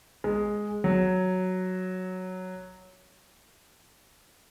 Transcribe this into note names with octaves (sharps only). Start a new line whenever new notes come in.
G#3
F#3